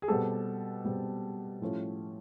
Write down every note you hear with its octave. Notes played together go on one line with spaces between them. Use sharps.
G#4
B2 G3 C4 G4 A4
B2 G3 C4
A2 F3 A3 C#4